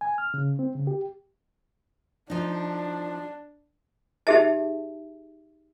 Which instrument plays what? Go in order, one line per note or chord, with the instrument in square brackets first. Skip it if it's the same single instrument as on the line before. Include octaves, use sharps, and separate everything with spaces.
[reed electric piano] G#5
F6
C#3
C4
C#3
G4
[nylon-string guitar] F3 D#4 [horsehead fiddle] D4
[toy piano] D#4 G4 G#4 E5 A5